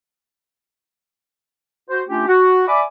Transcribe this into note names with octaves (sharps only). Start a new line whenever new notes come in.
F#4 C5
A3 C#4 D4 F4 G4
F#4
D5 E5 G#5 B5 D6